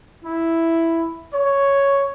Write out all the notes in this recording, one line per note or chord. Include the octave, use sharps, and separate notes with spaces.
E4
C#5